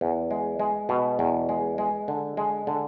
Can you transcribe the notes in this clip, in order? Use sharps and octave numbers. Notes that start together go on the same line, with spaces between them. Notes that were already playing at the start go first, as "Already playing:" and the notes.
E2
G#3
G#3
B2
E2
G#3
G#3
D3
G#3
D3